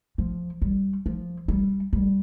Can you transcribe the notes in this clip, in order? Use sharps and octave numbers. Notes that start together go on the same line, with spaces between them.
F3
G3
F3
G3
G3